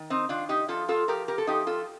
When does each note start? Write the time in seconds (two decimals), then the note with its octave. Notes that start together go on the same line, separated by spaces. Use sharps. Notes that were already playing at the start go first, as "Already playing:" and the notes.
Already playing: D#3
0.10 C4 D#4
0.29 D#3 D4 F4
0.49 D#4 G4
0.68 F3 F4 A4
0.89 F4 A4
1.08 F3 G4 A#4
1.28 G4 A#4
1.38 A4
1.47 F3 D#4 G4
1.67 F4 A4